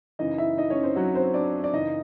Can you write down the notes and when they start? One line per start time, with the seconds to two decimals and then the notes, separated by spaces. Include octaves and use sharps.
0.19 F#2 C#3 E3 D#4 D#5
0.38 E4 E5
0.58 D#4 D#5
0.70 C#4 C#5
0.83 C4 C5
0.96 F#3 F#4
1.15 C4 C5
1.34 D4 D5
1.64 D5
1.73 F#2 C#3 E3 D#4 D#5